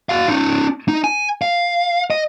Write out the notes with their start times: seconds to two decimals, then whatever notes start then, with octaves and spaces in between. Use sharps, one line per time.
0.09 F#4 F5
0.28 C#4 D#4
0.88 D#4
1.04 G#5
1.42 F5
2.10 D#5